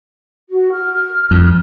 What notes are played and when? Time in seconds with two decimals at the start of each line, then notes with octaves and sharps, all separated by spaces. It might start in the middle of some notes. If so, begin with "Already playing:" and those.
0.49 F#4
0.72 F6
1.31 F2